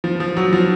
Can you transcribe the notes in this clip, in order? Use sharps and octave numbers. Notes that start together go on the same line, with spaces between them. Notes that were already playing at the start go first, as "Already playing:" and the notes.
F3
F3
F#3
F3